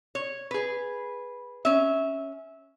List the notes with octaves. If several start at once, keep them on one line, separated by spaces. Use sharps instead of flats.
C#5
G#4 B4
C#4 E5